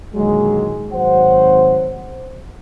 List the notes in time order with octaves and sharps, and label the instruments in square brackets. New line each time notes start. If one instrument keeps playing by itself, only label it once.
[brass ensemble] A#2 D3 D#3 F#3 G#3
G#1 F#3 C5 F#5